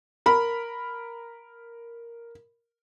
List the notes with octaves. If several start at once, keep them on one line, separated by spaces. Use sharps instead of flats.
A#4 B5